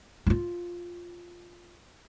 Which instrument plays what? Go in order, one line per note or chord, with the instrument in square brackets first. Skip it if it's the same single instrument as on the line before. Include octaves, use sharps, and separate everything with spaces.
[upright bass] E4 F4